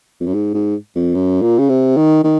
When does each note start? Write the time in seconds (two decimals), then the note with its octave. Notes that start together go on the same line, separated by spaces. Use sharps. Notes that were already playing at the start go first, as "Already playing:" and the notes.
0.20 F2
0.26 F#2
0.34 G#2
0.54 G#2
0.95 F2
1.15 F#2
1.42 A#2
1.59 C#3
1.69 C3
1.97 D#3
2.23 D#3